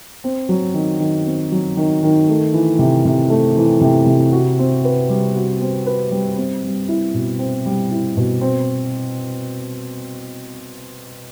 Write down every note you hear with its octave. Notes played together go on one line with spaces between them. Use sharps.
C4
F#3
D#3
D#3
C4
F#3
D#3
D#3
A3
E3
C3
C3
A3
E3
C3
C3
F#4
C4
B4
G3
F#4
C4
B4
G3
C4
G3
E4
B2
C4
G3
E4
B2
C4